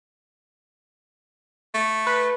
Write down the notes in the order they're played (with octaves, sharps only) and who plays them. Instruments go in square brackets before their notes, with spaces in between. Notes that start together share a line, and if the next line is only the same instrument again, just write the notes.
[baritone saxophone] A3
[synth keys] B4